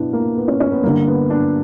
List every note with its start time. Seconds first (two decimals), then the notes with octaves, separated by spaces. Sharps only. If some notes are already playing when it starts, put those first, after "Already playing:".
Already playing: B2 B3 D4 E4
0.13 A#3
0.37 B3
0.48 C#4
0.60 C#4
0.72 B3
0.83 G2 D3 A#3
1.07 B3
1.30 D4